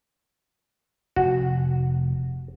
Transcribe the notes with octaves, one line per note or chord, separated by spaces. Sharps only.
F1 F#4